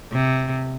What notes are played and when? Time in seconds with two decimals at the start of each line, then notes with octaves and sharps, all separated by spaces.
0.12 C3